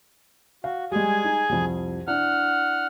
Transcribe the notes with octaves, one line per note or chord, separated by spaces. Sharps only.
F#4 F5
G3 G#3 G#4 G#5
D#4
C2 F2
D4 E4 F#5 F6